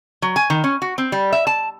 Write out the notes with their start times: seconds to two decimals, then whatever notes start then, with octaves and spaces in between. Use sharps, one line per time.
0.22 F#3
0.36 G#5
0.50 D#3
0.64 C#4
0.82 F#4
0.98 C4
1.12 G3
1.33 E5
1.47 A5